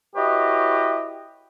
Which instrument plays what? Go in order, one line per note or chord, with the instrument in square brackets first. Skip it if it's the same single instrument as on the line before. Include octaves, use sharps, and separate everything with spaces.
[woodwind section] E4 F#4 G4 B4 C#5 D#5